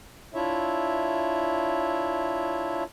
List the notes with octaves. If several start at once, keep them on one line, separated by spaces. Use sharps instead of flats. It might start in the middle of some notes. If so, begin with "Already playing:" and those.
D4 E4 F4 C#5 E5